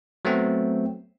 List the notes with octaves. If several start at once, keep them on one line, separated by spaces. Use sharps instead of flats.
F#3 A3 B3 C4